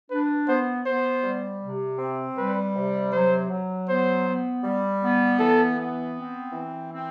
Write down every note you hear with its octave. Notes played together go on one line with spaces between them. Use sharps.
D4 B4
B3 C5
B3 C5
G3
C3
C4
G3 B4
C3
F#3 C5
F#3
B3 C5
B3
G3
B3
E3 A4
B3
C4
E3
C4